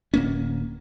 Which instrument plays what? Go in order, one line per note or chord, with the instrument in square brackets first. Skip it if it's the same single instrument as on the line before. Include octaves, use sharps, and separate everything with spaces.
[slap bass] D1 A#3 C#4